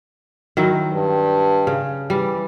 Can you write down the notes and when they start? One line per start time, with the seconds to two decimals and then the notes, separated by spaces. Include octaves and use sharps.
0.57 D#3 F#3 E4
0.94 G2
1.67 C#3
2.10 E3 G3